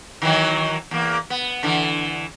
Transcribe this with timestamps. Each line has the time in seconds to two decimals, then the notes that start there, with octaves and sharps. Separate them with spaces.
0.22 D#3 E3 F#3
0.91 E2 A#3
1.30 B3
1.63 D3 E3